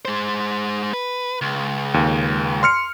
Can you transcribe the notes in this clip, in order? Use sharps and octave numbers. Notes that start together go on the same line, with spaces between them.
G#3 C5
B4
C#2
D#2
C6 F6 C#7